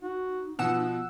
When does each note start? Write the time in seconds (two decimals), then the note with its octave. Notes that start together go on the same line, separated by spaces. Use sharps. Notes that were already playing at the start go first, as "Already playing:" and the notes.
0.02 D#4 F#4
0.59 B2 F3 B3 F#5 E6